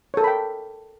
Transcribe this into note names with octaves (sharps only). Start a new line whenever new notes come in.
A4 A#4 C#5 G5 B5